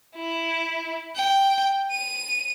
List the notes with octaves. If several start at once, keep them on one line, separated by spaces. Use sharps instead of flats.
E4
G5
D#7